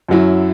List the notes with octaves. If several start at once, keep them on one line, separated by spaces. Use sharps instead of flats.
F#2 F#3 E4